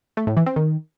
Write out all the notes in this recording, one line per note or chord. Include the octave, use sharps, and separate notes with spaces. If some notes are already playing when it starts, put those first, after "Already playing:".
A3
A2
E3
C4
D#3